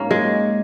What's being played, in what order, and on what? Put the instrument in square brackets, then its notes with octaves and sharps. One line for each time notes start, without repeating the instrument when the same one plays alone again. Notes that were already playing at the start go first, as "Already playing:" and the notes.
Already playing: [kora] G#2 A#3 C#4
G#3